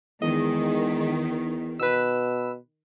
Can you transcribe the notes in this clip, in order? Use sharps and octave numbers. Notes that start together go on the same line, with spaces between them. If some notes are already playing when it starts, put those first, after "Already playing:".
E2 D#3 G#3 D#5
B2 B4 E6